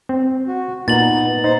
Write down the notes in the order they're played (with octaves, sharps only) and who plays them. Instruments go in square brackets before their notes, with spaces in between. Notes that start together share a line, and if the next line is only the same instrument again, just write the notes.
[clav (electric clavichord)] C4
[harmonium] F#4
[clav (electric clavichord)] A#2 [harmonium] B3 D#4 [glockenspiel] A6 F#7
[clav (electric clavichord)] D#4 [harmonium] C5